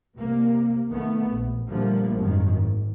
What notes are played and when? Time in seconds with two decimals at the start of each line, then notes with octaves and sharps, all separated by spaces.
0.16 C3 A#3
0.89 D#3 A3 B3
1.30 A#1
1.69 A#2 D3 F3 G3 A3 A#3
2.15 G#1 F#2 D#3
2.60 G#2